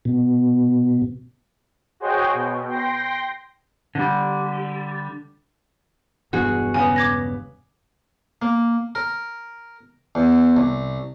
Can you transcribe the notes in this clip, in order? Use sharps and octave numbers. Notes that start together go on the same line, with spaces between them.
B2
F#4 G#4 C5 C#5 D#5 G5
B2
G5 C6 A#6
D3 G3
E1 E2 G2 F#4 G#4
C#3 B3 G#5
D6 G#6 A#6
A#3
A#4
E2
C2